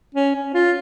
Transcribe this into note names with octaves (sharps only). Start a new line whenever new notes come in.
C#4
C#4
F4